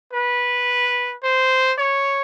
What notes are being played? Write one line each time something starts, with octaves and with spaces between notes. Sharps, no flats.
B4
C5
C#5